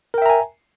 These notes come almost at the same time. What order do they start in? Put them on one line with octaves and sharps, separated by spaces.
A#4 G5 E5 A#5 G#5